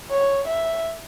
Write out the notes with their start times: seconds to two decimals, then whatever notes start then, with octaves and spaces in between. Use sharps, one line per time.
0.10 C#5
0.48 E5